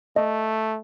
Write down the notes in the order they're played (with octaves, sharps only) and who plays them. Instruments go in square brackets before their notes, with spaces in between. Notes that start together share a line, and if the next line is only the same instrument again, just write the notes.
[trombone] A3 [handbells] D#5